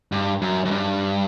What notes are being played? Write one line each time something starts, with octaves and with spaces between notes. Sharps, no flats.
G2
F#2
F#2
G2